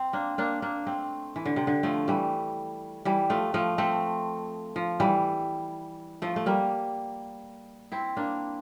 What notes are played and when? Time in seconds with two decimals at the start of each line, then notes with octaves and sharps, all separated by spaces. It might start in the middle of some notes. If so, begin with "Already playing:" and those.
Already playing: C4
0.13 A#3 D4
0.38 A#3 D4
0.62 A#3 D4
0.87 A3 C4
1.36 E3
1.46 D3
1.56 C3
1.67 D3
1.83 F3 A3
2.08 E3 G3
3.05 E3 G3
3.30 F3 A3
3.54 F3 A3
3.78 A3 C4
4.76 F3
5.00 E3 G3
6.22 F3 A3
6.36 A3
6.46 G3 A#3
7.92 C4 E4
8.17 A#3 D4